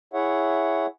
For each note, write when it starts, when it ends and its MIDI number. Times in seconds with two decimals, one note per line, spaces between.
0.13 0.86 64
0.13 0.86 68
0.13 0.86 73
0.13 0.86 76
0.13 0.86 78